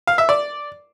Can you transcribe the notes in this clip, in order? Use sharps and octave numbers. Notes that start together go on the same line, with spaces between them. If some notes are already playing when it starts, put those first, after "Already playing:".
F5
E5
D5